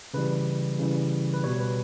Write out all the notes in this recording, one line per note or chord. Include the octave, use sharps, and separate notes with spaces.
C#3 E3 G3 B4
C#3 E3 G3
B4
B2 G3 C#5
B4